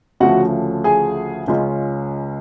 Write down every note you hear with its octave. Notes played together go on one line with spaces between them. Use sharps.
D2 C#3 F3 A3 C#4 F#4 F#5
G#4 G#5
C#2 C#3 G#3 C#4 F4